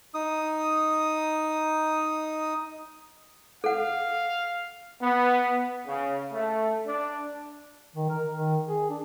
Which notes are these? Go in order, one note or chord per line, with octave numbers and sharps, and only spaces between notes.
D#4 D#6
A4 F5 F#5
B3
C#3
A3
D4
D#3
A#4
D#3
G#4
D4